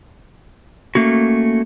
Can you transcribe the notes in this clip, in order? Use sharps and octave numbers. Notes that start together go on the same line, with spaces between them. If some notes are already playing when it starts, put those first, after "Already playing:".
A3 A#3 C#4 F#4